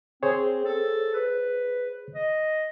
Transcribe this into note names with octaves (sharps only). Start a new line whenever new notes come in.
C4 G#4 C5 C#5
A4
B4
D#5